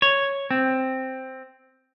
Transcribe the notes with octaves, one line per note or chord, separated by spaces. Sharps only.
C#5
C4